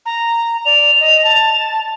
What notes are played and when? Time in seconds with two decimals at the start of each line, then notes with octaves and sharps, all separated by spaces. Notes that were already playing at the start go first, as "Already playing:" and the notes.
0.06 A#5
0.65 D5 F7
1.00 D#5
1.24 A5